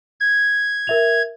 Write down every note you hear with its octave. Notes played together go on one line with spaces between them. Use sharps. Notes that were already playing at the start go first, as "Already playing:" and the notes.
G#6
A#4 E5 F7